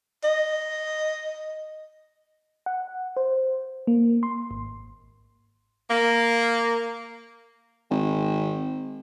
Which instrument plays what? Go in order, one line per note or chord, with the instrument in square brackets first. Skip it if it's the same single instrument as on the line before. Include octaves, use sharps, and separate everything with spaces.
[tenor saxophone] D#5
[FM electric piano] F#5
C5
A#3
C6
G#1
[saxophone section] A#3
[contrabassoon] G#1